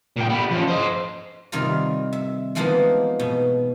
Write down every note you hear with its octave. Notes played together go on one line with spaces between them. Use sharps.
A#2 G5
G3 B3
F3 C#4
C5 D#5
C3 D#3 G3 F4 D5 A#5
E5
E3 F3 G#3 A#3 B3 D#4
B2